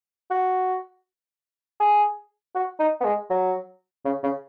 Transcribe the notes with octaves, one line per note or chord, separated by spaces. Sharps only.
F#4
G#4
F#4
D#4
B3
G#3
F#3
C#3
C#3